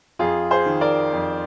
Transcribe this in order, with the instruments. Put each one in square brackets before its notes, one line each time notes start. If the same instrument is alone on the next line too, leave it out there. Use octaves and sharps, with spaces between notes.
[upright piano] F2 F4 G#4
G#4 C5
D#3
A#4 D5
F2